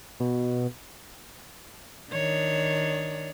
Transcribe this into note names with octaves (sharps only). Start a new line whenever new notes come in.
B2
D#3 D4 C#5